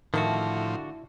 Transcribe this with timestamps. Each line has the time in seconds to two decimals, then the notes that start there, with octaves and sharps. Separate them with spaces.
0.14 A2 D3 D#3 F3 E4 F#4 A5